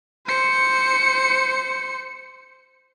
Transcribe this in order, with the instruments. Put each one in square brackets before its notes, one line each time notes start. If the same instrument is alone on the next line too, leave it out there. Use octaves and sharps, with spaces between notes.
[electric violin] C5 C#7